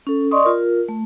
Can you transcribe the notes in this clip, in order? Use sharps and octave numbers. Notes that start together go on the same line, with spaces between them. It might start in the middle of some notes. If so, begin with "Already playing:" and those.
C#4 A4
D5 D#5 C6 C#6 D#6
F4 A#4
A3